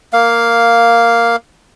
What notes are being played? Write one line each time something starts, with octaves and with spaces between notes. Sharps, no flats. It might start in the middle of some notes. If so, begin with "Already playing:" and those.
A#3 F5